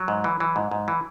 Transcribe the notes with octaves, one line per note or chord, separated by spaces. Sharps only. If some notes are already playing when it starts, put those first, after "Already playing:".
Already playing: F#3
G#2
E3
E3
G#2
G#2
E3